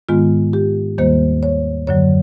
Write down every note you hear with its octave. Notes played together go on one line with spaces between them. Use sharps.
G#2 D#3 G#3 B3 F4
G4
D#2 D#3 G3 A#3 C5
C#5
F#2 D3 F#3 C#5